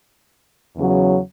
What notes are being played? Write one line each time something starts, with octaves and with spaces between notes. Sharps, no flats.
E2 C#3 F#3